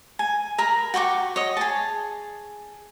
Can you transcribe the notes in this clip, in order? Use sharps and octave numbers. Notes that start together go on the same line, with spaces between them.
G#5
A#4 A#5 B5
F#4 G5 C#6 D6
C#5 D#5
G#4 A5